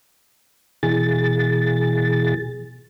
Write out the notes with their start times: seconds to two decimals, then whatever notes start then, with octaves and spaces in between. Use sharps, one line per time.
0.83 B2 E3 G#4 A6